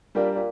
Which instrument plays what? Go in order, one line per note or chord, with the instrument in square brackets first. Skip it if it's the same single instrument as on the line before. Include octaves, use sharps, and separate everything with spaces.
[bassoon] A#2 [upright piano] G3 D4 G4 A#4 D5
[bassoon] A#2